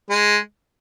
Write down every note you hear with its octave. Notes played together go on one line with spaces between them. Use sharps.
G#3